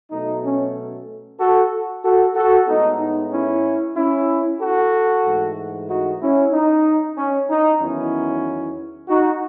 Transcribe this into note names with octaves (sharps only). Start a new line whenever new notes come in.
B2 F#3 A3 D#4
C#4
F#4 A4
F#4 A4
F#4 A4
A2 G#3 B3 D#4
D#4
C#4 E4
C#4 E4
F#4 A4
G#2 E3 A3
D#4 F#4
C#4 E4
D#4
C#4
D#4
E2 D#3 F#3 B3 C#4 E4
D#4 F#4